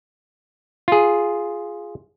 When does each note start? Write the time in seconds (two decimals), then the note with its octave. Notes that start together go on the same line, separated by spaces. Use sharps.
0.88 F4 G#4